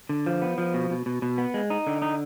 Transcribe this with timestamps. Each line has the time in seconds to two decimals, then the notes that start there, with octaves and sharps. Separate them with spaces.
0.09 D3
0.26 F3
0.42 B3
0.58 F3
0.74 B2
0.90 B2
1.06 B2
1.22 B2
1.38 B3
1.54 G#3
1.70 D#4
1.87 D3
2.02 D#4